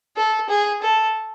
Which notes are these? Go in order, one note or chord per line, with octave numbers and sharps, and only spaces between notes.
A4
G#4
A4